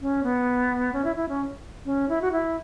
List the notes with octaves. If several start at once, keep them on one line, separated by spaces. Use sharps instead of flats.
C#4
B3
C#4
E4
E4
C#4
C#4
E4
F#4
E4